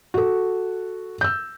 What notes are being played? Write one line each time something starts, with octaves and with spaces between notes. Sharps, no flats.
F#4 A4
E6 G6